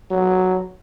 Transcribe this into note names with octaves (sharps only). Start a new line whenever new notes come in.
F#3